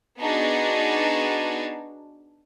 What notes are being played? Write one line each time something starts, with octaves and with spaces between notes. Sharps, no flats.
B3 D4 D#4 F#4 G#4